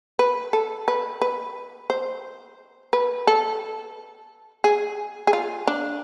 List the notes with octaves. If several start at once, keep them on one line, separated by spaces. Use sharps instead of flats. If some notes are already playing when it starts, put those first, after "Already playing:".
B4
A4
B4
B4
C5
B4
A4
G#4
G#4
F4
D4